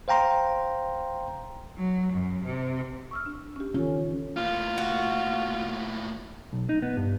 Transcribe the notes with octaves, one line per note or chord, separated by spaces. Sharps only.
C5 F5 G5 A#5 C6
F#3
F#2
C3
C#6 E6 F6
D4
C#4 G4
D#3 E3 C#4 F4 A4
A2 A#3 F4
F#4
B1
D#4
B3
G2